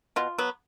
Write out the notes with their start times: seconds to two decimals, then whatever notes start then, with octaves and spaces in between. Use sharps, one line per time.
0.16 B2 F4
0.38 F#3 B3